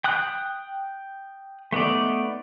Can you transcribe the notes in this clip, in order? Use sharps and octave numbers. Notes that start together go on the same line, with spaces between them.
G5 D#6 F#6
A3 B3 D#4 D5